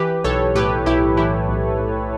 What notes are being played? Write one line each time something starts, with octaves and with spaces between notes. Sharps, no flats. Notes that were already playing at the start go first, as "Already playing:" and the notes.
Already playing: E3 G4 B4
B1 A4 C#5
A2 G4 B4
B1 E4 G4
E3 E4 G4
B1
A2